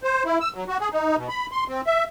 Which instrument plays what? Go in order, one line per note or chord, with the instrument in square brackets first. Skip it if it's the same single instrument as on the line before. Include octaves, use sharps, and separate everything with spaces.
[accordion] C5
E4
E6
F#3
F#4
G#4
D#4
B2
B5
C6
C4
E5